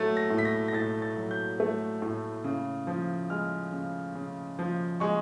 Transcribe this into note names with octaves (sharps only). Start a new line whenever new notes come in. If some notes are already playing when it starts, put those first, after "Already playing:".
Already playing: A2 F#3 A3 A6
A#6
A2
B6
A#6
A#6
A2 A6
A6
F#3
G6
A3
A2
C#3
F3
G#3 F6
C#3
C#3
F3
G#3 C#6